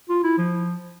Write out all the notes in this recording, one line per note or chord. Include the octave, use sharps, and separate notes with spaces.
F4
E4
F3